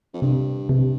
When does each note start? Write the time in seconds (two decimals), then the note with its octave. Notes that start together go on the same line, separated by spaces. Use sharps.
0.13 F2
0.22 G2 C3
0.69 G2 C3